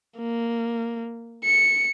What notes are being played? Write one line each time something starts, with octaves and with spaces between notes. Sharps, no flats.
A#3
C#7